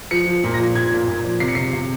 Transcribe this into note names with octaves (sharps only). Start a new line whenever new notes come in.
F3 C#7
F3
A#2
A#6
F3
A#2 G#6
A#2
A#2
F3
C3 C7
C#7
C3 C7
C3